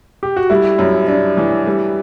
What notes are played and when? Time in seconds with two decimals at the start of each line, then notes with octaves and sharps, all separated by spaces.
0.23 G4
0.37 F#4
0.50 G3 E4
0.79 F#2
1.08 D4
1.37 E3
1.67 G3